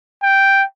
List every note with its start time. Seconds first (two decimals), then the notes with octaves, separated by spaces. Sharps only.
0.23 G5